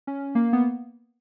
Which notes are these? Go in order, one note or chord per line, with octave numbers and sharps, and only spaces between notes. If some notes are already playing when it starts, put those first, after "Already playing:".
C#4
A#3
B3